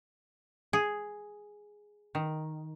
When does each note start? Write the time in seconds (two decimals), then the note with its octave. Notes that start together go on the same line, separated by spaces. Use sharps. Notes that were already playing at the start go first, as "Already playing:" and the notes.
0.73 G#4
2.15 D#3